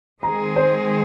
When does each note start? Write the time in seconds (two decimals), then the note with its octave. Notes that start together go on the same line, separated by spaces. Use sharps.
0.23 D#3 G#3 C4 G#4 A#5
0.56 C5